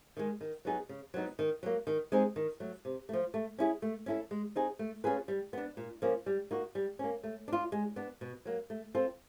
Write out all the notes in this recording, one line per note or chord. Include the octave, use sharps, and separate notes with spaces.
D#3 G#3
D#3
F#3 B3 D#4 G#4
C#3
F#3 B3 D#4
D#3
F#3 A#3
D#3
G#3 C4 D#4 G#4
D#3
F#3 A3
C3
F3 A3
A3
C#4 E4 G#4
A3
C#4 E4 A4
G#3
C4 D#4 G#4
A3
C#4 F4 G#4 B4
G3
B3 D4
A#2
F3 A#3 C#4
G3
A#3 D#4 F#4
G3
A#3 C#4
A3
D4 F4
G#3
B3 D4
B2
F#3 A#3
A3
C4 F4 A4